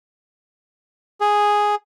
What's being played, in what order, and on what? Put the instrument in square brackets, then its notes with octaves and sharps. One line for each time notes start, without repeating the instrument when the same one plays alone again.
[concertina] G#4